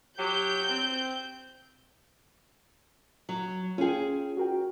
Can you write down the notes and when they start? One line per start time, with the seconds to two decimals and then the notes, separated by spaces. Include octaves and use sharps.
0.19 F#3 G4 G6
0.69 C4
3.29 F#3
3.78 C#4 F4 G#4 G5
4.37 F#4 A#4 G5